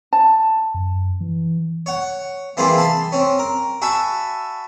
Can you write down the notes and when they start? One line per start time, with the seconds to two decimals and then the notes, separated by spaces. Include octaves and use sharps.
0.13 A5
0.74 F#2
1.21 E3
1.86 C#5 F#5
2.57 E3 A#3 C4 F4 G#4 B4
2.78 A5 B5 C6
3.12 C4 C#4
3.39 A#4
3.82 F#4 E5 G#5 A5 B5